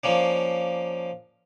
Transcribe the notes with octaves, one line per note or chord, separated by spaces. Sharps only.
F3 A#3 C#4 D4